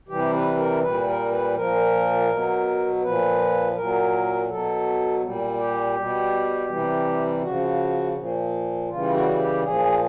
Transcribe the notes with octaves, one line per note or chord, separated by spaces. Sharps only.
C3 E3 G3 G4
B4
A#4
A#2 G3 B4
A#4
B4
A#2 F3 A#4
B2 F#3
A#2 F3 B4
A#2 F#3 A#4
B2 F#3 A4
A#2 G3
G4
B2 G3
C3 E3 G3
C#3 F3 F#4
A#2 F3
C#3 E3 G3 F4
F#4
G4
A#2 F3 G#4